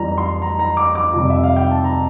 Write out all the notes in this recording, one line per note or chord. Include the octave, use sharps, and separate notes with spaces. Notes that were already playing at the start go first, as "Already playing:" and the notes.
Already playing: F2 E3 G3 A#5
C6
A#5
A#5
D6
D6
F2 C3 G3
E5
F5
G5
A5
A#5